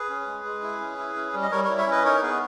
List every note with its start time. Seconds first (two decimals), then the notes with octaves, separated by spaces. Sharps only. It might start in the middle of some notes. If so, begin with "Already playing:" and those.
Already playing: G#4 B4
0.09 C#4
0.26 G#3
0.44 G#3
0.62 E4
0.80 C#4
0.98 E4
1.16 C#4
1.34 G3
1.43 D#5
1.51 G3 A#4 C#5
1.65 A#4 C#5
1.69 E4
1.78 C#5 E5
1.86 C#4 B4 D#5
2.05 D#4 A#4 C#5
2.22 B3 G#4 B4